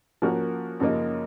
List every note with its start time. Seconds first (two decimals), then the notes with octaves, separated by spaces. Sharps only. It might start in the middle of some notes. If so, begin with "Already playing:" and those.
0.22 F3 A#3 C#4 F#4 A#4
0.80 F#2 C#3 F3 A#3 D#4